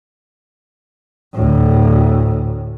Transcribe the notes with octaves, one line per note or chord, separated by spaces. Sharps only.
D2 A2